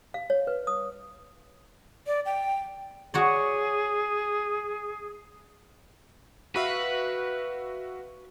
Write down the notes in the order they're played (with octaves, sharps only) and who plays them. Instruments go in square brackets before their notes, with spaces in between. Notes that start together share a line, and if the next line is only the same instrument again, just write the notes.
[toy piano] F5
C#5
B4
D#6
[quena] D5
G5
[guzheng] F#4 C#5 D5 [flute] G#4
[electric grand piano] F#4 E5 F5 [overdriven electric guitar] B4